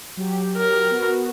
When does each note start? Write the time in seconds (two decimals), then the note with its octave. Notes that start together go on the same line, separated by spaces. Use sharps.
0.17 F#3 G4
0.57 A#4
0.91 B3 F#4